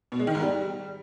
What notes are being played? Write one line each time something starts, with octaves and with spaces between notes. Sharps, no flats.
B2
G#3
D#3
G#2
G3